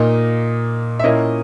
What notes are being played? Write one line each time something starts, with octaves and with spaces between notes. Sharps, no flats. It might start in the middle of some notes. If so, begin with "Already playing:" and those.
Already playing: A#2 A#3 D#4 D#5
E5
A#2 A#3 C#4 E4 D#5